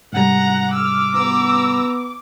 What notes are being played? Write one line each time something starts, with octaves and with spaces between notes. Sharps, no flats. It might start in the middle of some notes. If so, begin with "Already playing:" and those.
G#2 C3 G3 F#5 A#5
D6 E6 F6
B3 A#5 E6